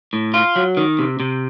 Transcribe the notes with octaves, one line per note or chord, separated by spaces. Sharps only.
A2
F4
F#3
D#3
C3
C3